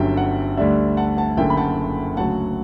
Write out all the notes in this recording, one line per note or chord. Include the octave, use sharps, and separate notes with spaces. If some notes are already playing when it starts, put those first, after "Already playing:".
Already playing: G1 G2 D3 F#3 C#4 E5 G5
F#5
D2 D3 G3 D4 E5
F#5 A5
F#5 A5
F#1 F#2 D3 A3 E5 G5
B5
F#5 A5
D2 C#3 F#3 F#5 A5